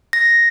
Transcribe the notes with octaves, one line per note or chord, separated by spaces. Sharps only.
A#6